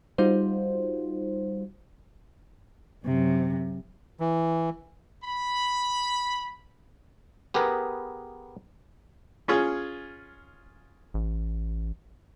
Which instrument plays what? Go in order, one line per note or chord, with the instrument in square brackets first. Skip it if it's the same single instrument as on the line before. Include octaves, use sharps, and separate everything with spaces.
[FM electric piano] G3 D#4 F4 F#4 C5
[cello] F#2 C3
[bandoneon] E3
[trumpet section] B5
[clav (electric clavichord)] B3 G4 G#4 A#4 B4
[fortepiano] C#4 F4 G#4
[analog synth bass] A1